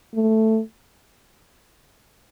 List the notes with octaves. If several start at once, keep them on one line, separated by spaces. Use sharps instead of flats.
A3